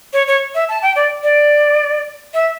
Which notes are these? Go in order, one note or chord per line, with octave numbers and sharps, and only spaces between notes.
C#5
C#5
E5
A5
G5
D5
D5
E5